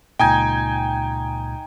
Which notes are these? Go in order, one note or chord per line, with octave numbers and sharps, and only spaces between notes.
C#2 A#2 D#4 G5 G#5 G#6